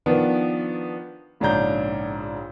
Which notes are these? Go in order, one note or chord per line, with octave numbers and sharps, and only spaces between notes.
D#3 F3 B3 D4
A#1 G#2 C#3 D4 A#5 G6